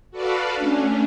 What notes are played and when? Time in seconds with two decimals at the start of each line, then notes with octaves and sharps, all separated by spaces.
0.11 F#4 A4 B4 D5 F5
0.55 A3 C#4 D4